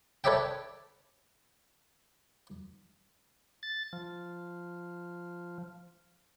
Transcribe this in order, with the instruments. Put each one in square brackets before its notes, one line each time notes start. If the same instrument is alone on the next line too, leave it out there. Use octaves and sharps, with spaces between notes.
[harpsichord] A4 B4 C#5 D5 E5 G5
[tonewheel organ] A6
F3